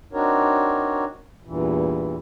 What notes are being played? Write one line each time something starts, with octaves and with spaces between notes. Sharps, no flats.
C4 D4 D#4 F#4 A#4 C#5
E2 G2 A#2 E3